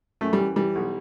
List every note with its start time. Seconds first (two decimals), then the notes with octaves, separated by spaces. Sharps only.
0.21 F#2 A3
0.33 G3
0.38 E3
0.56 E3 G3
0.75 B1